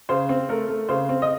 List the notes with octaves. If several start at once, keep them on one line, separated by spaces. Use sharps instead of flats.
C#3 C5
C4
A3 A#4
A3
C#3 C5
C4
D#5